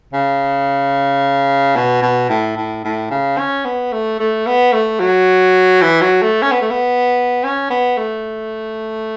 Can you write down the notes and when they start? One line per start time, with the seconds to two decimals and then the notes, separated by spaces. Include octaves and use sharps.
0.13 C#3
1.76 B2
2.02 B2
2.29 A2
2.57 A2
2.84 A2
3.10 C#3
3.38 C#4
3.65 B3
3.92 A3
4.20 A3
4.47 B3
4.73 A3
5.00 F#3
5.81 E3
6.01 F#3
6.22 A3
6.42 C#4
6.52 B3
6.62 A3
6.70 B3
7.44 C#4
7.70 B3
7.98 A3